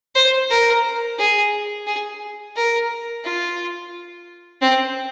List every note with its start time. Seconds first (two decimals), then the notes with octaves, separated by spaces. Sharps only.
0.15 C5
0.50 A#4
1.19 G#4
1.87 G#4
2.56 A#4
3.24 F4
4.62 C4